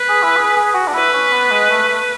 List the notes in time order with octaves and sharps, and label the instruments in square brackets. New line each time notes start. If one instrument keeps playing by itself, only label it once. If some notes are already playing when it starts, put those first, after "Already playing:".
Already playing: [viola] B4
[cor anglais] G#4
E4
G#4
G#4
F#4
D4
[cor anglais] E4 [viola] B4
[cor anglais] C#4
B3
G#3
A3
A3